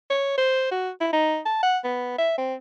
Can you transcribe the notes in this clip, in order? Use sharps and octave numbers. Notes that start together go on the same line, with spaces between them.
C#5
C5
F#4
E4
D#4
A5
F#5
B3
E5
C4